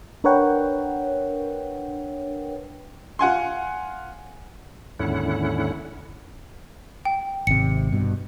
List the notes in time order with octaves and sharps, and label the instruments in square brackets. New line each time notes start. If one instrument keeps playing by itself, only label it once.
[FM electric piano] D4 A#4 B4 C#5 F#5 G5
[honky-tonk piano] F4 F#5 G#5 C6
[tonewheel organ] D#2 G#2 D3 C#4 E4 F#5
[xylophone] G5
[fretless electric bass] G#1 C3 [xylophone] C#7
[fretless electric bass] G2 B2